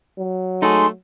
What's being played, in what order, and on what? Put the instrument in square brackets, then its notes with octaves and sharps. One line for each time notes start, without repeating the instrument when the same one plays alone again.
[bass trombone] F#3
[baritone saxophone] A3 [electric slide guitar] D#4 G#4 [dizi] C6